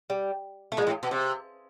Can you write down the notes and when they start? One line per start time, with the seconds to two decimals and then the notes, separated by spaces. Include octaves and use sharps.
0.10 G3
0.72 A3
0.77 A#2 G#3
0.87 A2
1.03 B2
1.11 C3